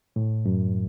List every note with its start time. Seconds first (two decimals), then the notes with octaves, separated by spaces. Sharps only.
0.16 A2
0.46 F#2